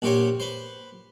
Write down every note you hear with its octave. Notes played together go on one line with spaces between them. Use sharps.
A#1 F#4 G4 C5 C#5
B4 C5